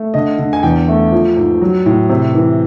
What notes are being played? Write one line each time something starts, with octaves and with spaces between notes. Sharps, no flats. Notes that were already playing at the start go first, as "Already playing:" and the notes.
Already playing: A3
D3 D#5
D3
G#5
E2 G5
A3
F3
G#2
F#3
A2
C3
E3